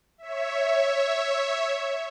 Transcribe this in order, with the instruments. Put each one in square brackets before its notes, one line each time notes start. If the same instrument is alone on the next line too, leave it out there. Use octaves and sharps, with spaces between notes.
[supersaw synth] C#5 E5